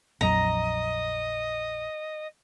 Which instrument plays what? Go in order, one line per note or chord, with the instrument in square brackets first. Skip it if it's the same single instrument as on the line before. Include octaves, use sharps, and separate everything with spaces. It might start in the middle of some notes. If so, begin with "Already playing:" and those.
[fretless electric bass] A#1 F2 F#3 [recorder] D#5 [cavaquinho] A#5